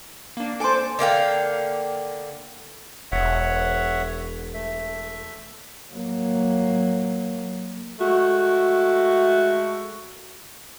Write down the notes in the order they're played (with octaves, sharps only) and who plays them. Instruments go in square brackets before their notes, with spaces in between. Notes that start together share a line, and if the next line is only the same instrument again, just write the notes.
[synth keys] A#3 D4
[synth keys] A4 D6 [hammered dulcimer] C5 G#5
[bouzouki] D3 A#3 F5 G5
[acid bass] E1 [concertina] C#5 E5 F#5
[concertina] A3 E5
[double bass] F#3 A#3
[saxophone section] G#3 A3 F#4